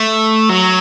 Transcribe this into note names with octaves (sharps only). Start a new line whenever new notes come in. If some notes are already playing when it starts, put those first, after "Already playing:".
Already playing: A3
F#3